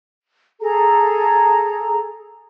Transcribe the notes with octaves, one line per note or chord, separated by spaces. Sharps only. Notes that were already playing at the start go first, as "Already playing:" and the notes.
G#4 A4 A#5